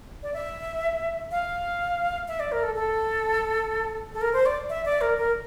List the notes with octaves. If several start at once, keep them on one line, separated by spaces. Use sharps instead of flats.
D5
E5
F5
E5
D5
A#4
A4
A4
A4
A#4
C5
D5
E5
D5
A#4
A#4